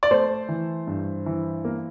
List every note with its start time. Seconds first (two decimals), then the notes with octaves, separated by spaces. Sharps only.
0.03 D5
0.11 A3 C5
0.49 E3
0.87 G2
1.26 E3
1.65 A#3